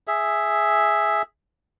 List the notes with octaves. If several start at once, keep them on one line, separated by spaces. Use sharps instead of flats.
G#4 E5